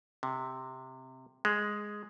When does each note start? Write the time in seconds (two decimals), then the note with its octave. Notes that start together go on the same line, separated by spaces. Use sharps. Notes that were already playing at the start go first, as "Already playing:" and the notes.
0.23 C3
1.45 G#3